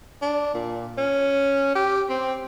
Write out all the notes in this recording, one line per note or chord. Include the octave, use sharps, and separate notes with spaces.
D4
A#2
C#4
G4
C4